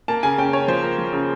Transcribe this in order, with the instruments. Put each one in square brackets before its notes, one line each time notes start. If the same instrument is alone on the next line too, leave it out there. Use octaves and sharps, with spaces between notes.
[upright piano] A#3 A5
C#3 G#5
C#4 G5
C#4 C#5
F3 C5
A#3
F3
C#3